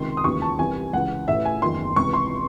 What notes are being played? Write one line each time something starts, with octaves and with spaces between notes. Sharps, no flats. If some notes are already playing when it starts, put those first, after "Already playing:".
Already playing: C#2 C3 D#3 C6
D#6
E1 D#2 C#3 E3 C#6
A5
C2 C3 E3 G#5
C#2 C#3 E3 F#5
A1 A2 E3 E5
G#5
F#1 E2 D#3 C6
C#2 C3 E3 C#6
C6